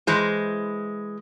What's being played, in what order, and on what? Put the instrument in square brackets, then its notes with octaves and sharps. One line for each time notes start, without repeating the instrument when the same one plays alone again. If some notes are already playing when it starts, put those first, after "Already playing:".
[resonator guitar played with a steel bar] E3 G#3 C5